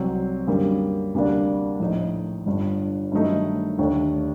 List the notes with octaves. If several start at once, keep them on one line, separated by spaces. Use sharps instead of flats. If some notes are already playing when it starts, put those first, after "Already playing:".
Already playing: C2 C3 F#3 C4
F#2 D3 G3 A#3
D2 C3 G3 A#3 D4
A#1 A2 A3 D#4
G1 G2 D3
G2 D#3 F#3 A3 D#4
D#2 D3 A3 D4